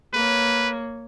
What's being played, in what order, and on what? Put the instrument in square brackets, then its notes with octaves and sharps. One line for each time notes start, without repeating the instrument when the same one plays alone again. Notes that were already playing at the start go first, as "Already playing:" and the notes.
[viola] A#3 C#5 [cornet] B4